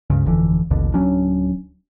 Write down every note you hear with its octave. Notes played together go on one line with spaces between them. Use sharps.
C#2 G2 C#3
G1 F2 D3 E3
A1 D#2 B2 D3
D1 F#3 C#4 D4